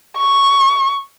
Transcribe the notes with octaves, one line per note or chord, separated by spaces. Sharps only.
C#6